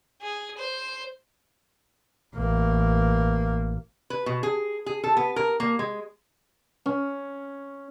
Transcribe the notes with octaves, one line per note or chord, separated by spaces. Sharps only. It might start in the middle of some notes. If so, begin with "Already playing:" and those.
G#4
C5
A1 A#3
B4
B2
G#4
G#4
A4
B3
A#4
A#3
G#3
C#4